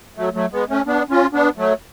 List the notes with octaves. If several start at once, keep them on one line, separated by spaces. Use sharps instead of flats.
F#3 A3
F#3 A3
G#3 B3
A3 C#4
B3 D4
C#4 F4
B3 D4
F#3 A3